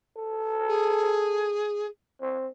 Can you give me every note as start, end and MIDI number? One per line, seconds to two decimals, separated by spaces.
0.16 1.58 69
0.68 1.86 68
2.22 2.48 60